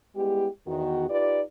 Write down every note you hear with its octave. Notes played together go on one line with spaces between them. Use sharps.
G3 G#3 B3 E4 G4
E2 D#3 F#4
D#4 F4 G4 B4 D5